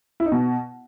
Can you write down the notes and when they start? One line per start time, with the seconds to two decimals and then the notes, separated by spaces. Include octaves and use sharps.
0.20 E4
0.26 D#4
0.32 B2